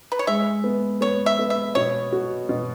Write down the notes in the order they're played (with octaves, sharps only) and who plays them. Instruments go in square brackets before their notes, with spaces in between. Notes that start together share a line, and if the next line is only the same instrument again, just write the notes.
[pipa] B4
C#5
[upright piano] G#3 [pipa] E5
[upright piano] B3
[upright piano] B3 [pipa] C#5
[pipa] E5
[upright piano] B3
[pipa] E5
[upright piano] B2 [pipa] C#5
[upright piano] F#4
B2